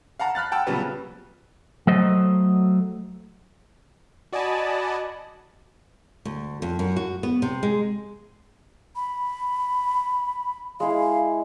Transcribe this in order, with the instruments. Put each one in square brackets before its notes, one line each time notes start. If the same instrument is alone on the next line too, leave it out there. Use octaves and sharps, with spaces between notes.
[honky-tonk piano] F5 F#5 A5 A#5
B5 F6 F#6 A6
F#5 G5 A5 E6
A#2 C#3 F#3 G3 B3
[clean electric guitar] F#3 A3 C5 D#5
[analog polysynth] F#4 D5 D#5 G#5 A5 B5
[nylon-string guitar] D2
F2
F#2
F#4
B3
C3
G#3
[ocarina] B5
[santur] G#3 E4 [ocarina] F5